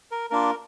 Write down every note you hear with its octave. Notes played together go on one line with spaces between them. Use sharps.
A#4
A#3 D4 F4 A#4